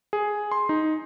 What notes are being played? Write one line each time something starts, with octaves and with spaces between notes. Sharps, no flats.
G#4
C6
D#4